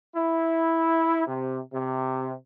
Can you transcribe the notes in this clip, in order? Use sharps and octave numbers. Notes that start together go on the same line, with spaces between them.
E4
C3
C3